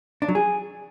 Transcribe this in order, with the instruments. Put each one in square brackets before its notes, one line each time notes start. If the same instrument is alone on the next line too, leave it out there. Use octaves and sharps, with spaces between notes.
[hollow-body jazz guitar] D4
F#3
G#4